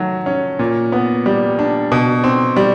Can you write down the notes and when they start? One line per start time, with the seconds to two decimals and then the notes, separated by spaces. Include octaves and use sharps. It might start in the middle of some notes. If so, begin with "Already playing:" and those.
Already playing: D#3 F#3 A3
0.26 C#4
0.59 A#2
0.92 B3
1.26 G3
1.59 D4
1.92 B2
2.24 C4
2.56 G3